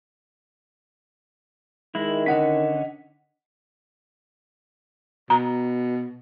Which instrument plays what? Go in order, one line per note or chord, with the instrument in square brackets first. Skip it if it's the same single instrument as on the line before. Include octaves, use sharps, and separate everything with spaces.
[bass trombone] D#3 [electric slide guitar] G#3 E4
[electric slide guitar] D3 C#4 [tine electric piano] D#5 F#5 B6
[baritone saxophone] B2 [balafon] A#5